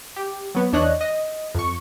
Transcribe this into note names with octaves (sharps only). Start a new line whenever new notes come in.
G4
F#3 B3
E2 D4 C#5 D#5 F#6
D#5
F2 C#6